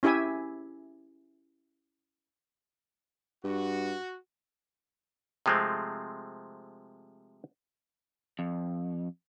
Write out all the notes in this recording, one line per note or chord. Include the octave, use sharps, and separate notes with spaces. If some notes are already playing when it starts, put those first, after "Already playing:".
C#4 E4 G4 E5 G#5
G2 F#4
C3 F3 G#3 A3 C4
F2